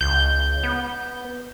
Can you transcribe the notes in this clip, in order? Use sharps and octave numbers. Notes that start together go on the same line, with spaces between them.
C#2 G6 G7
B3